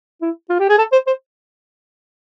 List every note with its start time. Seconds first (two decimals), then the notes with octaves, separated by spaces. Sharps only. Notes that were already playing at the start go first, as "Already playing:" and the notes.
0.22 E4
0.50 F4
0.60 G4
0.69 G#4
0.78 A4
0.92 C5
1.07 C5